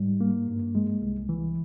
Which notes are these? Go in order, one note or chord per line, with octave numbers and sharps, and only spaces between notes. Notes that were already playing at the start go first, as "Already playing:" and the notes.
Already playing: G#2 G3
A#3
G2
G#3
C2
E3